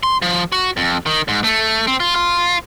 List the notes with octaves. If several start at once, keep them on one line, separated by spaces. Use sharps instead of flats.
C6
F3
F#4
F2
D#3
G#2
A3
C4
F4
F4